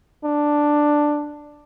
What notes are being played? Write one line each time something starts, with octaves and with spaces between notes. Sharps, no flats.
D4